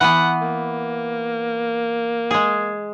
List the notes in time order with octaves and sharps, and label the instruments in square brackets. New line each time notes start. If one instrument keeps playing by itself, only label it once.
[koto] E3 B3 [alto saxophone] F#5
[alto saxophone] A#3
[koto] G#3 G#4